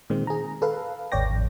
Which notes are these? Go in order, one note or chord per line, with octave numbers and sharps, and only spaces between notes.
A#2 D#3 G#3 C4
G#4 A#5
A4 B4 F5
G#1 D#2 C#5 D5 G5 A#6
A1 F2